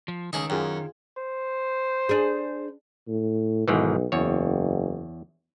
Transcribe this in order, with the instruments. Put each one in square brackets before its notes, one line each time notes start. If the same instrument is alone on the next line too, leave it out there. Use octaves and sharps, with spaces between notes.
[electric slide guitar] F3
[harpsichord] C#2 G#4 D#5 [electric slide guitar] D#3
[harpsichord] F#2 [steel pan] F4 G#4 G5
[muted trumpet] C5
[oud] D4 G#4
[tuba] A2
[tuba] B1 [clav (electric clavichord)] G#2 D#3 E3
[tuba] F#1 [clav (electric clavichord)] E2 C#5